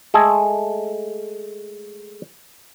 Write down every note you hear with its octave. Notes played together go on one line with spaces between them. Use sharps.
G#3 A3 G#4 A4